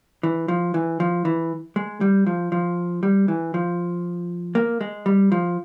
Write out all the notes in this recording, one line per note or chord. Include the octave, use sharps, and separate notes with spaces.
E3
F3
E3
F3
E3
G#3
G3
F3
F3
G3
E3
F3
A#3
G#3
G3
F3